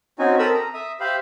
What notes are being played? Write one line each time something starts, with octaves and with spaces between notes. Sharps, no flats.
C4 C#4 D#4 F#4 G#5
C4 A4 A#4 B5 D#6 E6
A#5
E5 D#6
G4 C5 E5 F5 B5